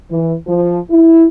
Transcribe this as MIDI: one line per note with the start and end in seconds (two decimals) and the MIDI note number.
0.11 0.33 52
0.46 0.78 53
0.91 1.26 64